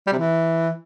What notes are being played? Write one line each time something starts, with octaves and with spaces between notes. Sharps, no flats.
G3
C3
E3